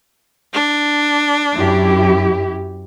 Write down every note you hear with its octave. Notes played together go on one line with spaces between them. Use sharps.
D4
F#2 E4 G4